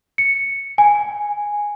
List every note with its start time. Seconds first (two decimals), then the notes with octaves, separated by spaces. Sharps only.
0.18 C#7
0.78 G#5